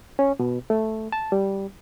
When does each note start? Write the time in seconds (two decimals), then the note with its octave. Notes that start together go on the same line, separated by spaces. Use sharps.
0.19 C#4
0.40 B2
0.70 A3
1.12 A5
1.32 G3